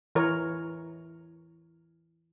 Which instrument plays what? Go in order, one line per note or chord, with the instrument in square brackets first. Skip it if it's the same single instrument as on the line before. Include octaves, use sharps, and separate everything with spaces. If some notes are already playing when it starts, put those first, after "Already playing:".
[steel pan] E3 A#4 C#5